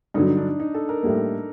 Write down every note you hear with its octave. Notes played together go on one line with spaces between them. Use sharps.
G2 D3 F#3 D#4
D#4
D4
D4
D#4
A4
A#4
A2 G3 A#3